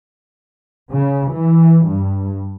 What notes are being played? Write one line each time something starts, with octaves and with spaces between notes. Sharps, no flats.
C#3
E3
G2